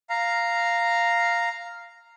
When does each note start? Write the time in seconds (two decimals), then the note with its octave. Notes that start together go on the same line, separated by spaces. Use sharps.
0.10 F5 A#5